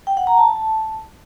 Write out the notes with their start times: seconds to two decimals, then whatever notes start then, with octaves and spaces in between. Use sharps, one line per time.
0.07 G5
0.17 F#5
0.27 A#5
0.37 A5